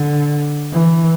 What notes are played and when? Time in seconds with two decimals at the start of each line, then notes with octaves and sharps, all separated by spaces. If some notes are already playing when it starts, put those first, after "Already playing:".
Already playing: D3
0.72 E3